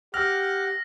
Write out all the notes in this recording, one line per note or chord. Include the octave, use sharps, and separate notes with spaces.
G4 F#5 G5 D6 E6 F6 A#6